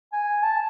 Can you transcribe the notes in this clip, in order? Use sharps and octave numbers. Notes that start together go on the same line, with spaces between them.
G#5
A5